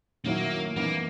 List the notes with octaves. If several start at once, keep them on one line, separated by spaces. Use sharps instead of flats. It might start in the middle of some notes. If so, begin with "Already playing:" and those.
F#2 D#3 F#3 A#3 C#4 E4
F#2 E3 A#3 B3 D#4